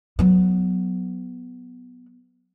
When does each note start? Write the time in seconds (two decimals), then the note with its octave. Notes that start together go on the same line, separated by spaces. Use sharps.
0.19 F#3 B3